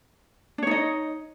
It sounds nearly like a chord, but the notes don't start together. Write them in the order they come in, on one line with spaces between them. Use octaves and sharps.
D4 C#5 D#4 D#5